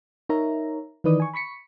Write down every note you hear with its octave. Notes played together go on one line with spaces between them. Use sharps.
D#4 A#4 C#5 E5 A#5
D#3 E3 D#4 B4 D5 D#6
G#5 C#6
B5 C#6 B6 C#7